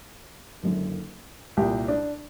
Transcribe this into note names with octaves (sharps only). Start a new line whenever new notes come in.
F#1 F#2 D3
C2 A#2 G4
D4